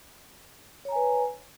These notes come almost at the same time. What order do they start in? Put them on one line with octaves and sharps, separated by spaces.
C#5 A#5 G#5 B4